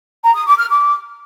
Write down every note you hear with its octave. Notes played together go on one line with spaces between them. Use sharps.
A#5
D#6
D6
F6
D6